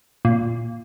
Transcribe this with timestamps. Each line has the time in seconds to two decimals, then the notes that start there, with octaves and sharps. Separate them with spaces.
0.25 A#2